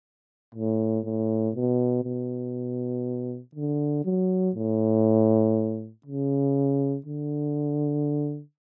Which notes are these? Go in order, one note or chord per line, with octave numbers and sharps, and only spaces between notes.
A2
A2
B2
B2
D3
F#3
A2
C#3
D3